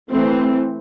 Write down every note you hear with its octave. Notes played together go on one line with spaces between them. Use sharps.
E3 A3 C4